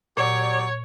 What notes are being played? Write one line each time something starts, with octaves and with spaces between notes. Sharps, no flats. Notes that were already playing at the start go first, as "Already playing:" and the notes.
A#2 F#3 G4 C#5 D5